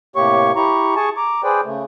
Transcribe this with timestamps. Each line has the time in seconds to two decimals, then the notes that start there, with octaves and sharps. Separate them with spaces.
0.16 A2 C3 A#3 G4 C#5 C#6
0.56 E4 G4 A#5 C#6
0.96 G#4 G#5 A5 C#6
1.17 A#5 D6
1.44 G#4 B4 C5 D5 G5
1.65 C#3 A3